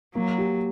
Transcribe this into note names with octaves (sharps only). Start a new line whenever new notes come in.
F#3 A#3
G4